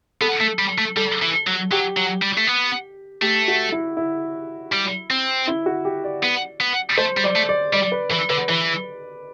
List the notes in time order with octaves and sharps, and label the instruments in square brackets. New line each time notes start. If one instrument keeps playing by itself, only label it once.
[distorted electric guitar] B3 [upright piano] A4
[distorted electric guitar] A3
G3
A3
[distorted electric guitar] G3 [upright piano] A4
[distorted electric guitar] E3
F#3
[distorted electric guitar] F#3 [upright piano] G4
[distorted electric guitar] F#3
G3
A3
B3
[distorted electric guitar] A3 [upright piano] G4
[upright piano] F#4
E4
E4
[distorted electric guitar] G3
C4
[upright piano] E4
F#4
G4
D5
[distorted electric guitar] B3
B3
[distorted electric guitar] A3 [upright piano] C5
[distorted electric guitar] G3
[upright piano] D5
[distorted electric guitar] A3
[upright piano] D5
[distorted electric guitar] G3 [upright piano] D5
[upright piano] B4
[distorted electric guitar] E3 [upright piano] B4
[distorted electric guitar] D3 [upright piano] B4
[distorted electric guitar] E3 [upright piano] B4